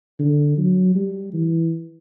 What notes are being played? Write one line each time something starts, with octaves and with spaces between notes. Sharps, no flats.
D3
F#3
G3
E3